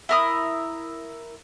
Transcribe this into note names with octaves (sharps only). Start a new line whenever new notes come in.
E4 A#4 D#6